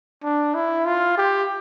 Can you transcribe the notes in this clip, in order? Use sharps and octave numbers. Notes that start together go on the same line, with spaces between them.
D4
E4
F4
G4